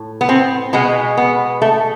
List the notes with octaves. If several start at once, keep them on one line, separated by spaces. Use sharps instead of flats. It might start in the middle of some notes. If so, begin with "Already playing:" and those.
Already playing: A2
B3
C4
B2 G#3 B3
B3
A3